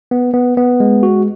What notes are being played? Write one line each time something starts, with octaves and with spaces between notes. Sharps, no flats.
B3
B3
B3
G#3
F#4